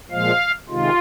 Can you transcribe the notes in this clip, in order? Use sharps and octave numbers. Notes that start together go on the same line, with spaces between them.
A#2 F3 G#3 F5
C3 D#3 G#3 F4